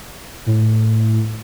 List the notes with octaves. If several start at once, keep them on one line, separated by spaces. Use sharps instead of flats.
A2